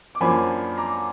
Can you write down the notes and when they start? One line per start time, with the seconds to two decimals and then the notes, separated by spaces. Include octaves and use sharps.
0.15 D6
0.20 F#2 F3 A#3 D4 G#5 B5
0.77 A#5 D6